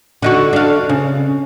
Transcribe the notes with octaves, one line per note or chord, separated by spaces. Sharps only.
D3 D#4 F#4
D4 F5
C#3